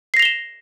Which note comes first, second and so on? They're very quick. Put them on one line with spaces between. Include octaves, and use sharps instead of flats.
C7 A#6 F7 G7 E7